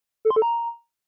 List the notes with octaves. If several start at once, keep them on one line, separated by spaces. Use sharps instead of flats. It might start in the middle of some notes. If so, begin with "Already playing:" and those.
A4
C6
A4
A#5